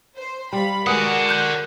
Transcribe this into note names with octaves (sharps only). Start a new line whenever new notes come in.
C5
G3 F5 B5
G#3 F#4 G#4 A#4 B4 D5 F#5 D#6
F#6 G6